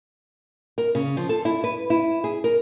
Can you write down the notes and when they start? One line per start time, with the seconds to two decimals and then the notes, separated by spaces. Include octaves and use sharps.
0.78 A#4
0.95 C#3
1.17 F3
1.29 A4
1.45 E4
1.64 B4
1.90 E4
2.24 G#4
2.44 A#4